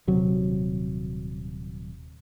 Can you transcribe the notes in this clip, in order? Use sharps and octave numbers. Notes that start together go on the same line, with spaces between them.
D#1 C3 F#3